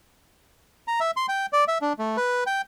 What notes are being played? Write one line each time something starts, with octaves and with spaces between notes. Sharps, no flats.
A#5
E5
C6
G5
D5
E5
D4
A3
B4
G5